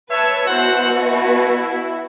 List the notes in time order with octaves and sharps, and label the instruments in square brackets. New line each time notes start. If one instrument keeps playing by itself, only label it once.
[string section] B4 A5 E6 [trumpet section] C#5 E5
[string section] B2 F#4 [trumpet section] E4 C5 F#5
[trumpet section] E4